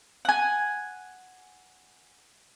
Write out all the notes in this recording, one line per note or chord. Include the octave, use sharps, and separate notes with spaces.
F#5 G#5